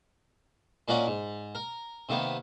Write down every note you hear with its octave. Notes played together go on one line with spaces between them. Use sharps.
A#2 A#3 C#4 F#4 D5 D#5
G#2
A#4
C3 D#3 A#3 B3